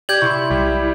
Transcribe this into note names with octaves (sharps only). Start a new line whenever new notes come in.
G4 D5 G6 G#6 F#7
C3 E4 C6 C#6
B1 G3 G4